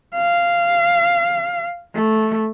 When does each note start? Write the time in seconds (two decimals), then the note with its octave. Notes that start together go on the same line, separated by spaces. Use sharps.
0.16 F5
1.95 A3